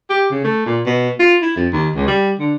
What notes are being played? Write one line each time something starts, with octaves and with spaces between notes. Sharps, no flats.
G4
C#3
A3
A#2
B2
F4
E4
F2
D#2
C#2
G3
D3